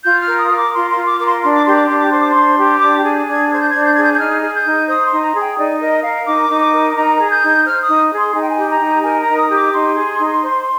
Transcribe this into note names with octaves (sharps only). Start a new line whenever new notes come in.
F4 G6
F6
A#4
D#6
A#4
D6
F4 C6
C6
F4
D6
A#4 D6
C6
D4 C6
D6
G4 C6
D6
D4 C6
D6
C5 C6
D6
D4 C6
G4
D4 D6
G#4
D4
G#6
C5 G#6
G6
D4 G#6
G6
G#4 G#6
G6
G6
D#4 F6
G#4
G6
D#4
C5 D#6
D#4 C6
A#5
G#4
G5
D#4 D5
A#4 D#5
A#4 F5
D#4 D6
D#4
D6
A#4
D#4 A#5
G#4
G6
D#4
C5 F6
D#6
D#4
G#4
C6
D#4 G#5
G5
G#5
G4
A#5
D#4
A#4 G#5
A#5
D#4
D#6
G4
D6
D#4 C6
G#4
D#4
C5